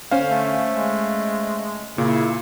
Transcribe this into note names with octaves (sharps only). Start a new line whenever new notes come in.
D3 C#4 C5 F5
A3
G#3
A#2 C#3 E4